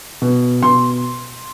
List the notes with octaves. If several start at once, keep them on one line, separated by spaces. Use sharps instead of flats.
B2
B2 C6